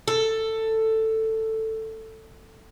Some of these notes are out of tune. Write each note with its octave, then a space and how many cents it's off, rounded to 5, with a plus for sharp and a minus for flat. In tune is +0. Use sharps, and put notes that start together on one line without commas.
A4 +10